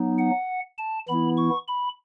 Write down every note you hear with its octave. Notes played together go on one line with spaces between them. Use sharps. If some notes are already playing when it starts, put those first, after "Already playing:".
Already playing: F#3 B3 D#4
F#5
A5
E3 B3 E4 B5
C#6
B5